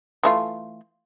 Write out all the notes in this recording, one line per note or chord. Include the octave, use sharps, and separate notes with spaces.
E3 A3 F4